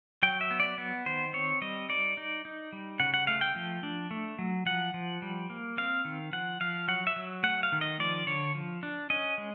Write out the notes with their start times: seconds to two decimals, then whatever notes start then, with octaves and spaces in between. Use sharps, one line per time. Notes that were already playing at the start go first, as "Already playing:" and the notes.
0.23 F#3 G5
0.41 E5
0.51 B3
0.60 D5
0.78 B3
1.06 D#3 C5
1.33 C4 C#5
1.62 G3 D#5
1.89 D#4 D5
2.17 D#4
2.45 D#4
2.73 G3
3.00 C#3 F#5
3.14 F#5
3.27 A3 F5
3.41 G5
3.56 F3
3.83 D4
4.11 A3
4.39 F#3
4.66 F3 F#5
4.94 F3
5.22 G3
5.50 A#3
5.78 C4 F5
6.05 D#3
6.33 F3 F#5
6.61 F3 F5
6.88 F#3 F#5
7.07 E5
7.16 F#3
7.43 A3 F#5
7.63 F5
7.72 D#3
7.81 D#5
8.00 F3 D5
8.27 D3 C#5
8.55 F3
8.83 D4
9.10 C#4 D#5
9.38 G#3